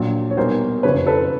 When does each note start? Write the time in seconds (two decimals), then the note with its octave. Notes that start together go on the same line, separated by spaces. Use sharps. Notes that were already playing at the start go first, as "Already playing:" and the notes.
Already playing: A#1 A#2 F#3
0.31 C#5
0.36 B1 B2 G3 A#4 C5
0.83 F#1 F2 C#3 E3 B4 C#5
1.07 A4 B4